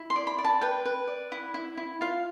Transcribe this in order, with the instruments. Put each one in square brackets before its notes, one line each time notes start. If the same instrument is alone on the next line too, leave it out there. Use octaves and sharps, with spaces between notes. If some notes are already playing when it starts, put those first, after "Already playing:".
Already playing: [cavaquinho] E4
C6
D5
B5
D5
A5
B4 G5
B4
D5
E4
E4
E4
F4 F5